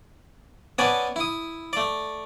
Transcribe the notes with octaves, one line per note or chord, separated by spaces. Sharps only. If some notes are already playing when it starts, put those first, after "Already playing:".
B3 C#4 B4 D5 G#5 A5
E4 D#6
A3 D5